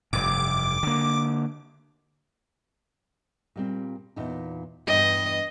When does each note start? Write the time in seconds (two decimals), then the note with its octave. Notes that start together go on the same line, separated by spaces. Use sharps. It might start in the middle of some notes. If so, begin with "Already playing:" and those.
0.13 F1 G2 D6
0.83 D3 A#3
3.56 A#2 G3 C4
4.16 E2 A#2 D#4
4.87 E2 G2 D#5 G5